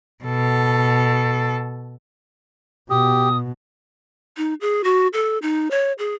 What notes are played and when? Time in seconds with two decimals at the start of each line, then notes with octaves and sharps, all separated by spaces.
0.24 B2 A4
2.90 B2 G4 D#6
4.37 D#4
4.61 G#4
4.84 F#4
5.13 A4
5.42 D#4
5.71 C#5
5.99 G#4